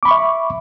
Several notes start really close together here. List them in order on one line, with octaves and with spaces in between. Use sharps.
D6 B5 C#6 E5